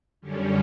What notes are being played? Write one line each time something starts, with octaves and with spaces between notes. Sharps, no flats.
F#2 D3 G3 C#4